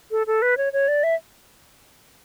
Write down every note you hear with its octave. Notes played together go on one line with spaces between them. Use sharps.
A4
A4
B4
C#5
C#5
D5
E5